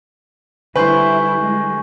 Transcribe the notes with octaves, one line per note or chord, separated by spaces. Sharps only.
D3 G3 E4 B4 C5 G#5 C#6 G6
G#3